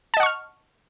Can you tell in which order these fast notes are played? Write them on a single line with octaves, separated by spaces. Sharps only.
A5 D#5 F#5 C#6 F6